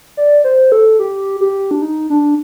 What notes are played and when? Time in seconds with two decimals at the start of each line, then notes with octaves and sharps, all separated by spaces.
0.17 D5
0.44 C5
0.72 A4
0.99 G4
1.41 G4
1.71 D4
1.82 D#4
2.10 D4